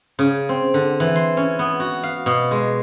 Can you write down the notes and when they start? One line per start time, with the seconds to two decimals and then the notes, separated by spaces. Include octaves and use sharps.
0.19 C#3
0.49 C4
0.74 D3
1.00 E3
1.15 C6
1.37 C#4
1.59 B3
1.80 F#4
2.03 F5
2.26 B2
2.51 G#3